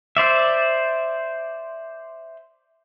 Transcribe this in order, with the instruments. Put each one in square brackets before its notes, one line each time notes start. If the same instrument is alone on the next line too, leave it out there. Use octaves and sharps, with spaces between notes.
[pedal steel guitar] C5 D5 E5